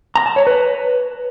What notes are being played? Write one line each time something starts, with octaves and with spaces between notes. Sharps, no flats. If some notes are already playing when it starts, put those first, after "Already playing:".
A#5
A5
C#5
B4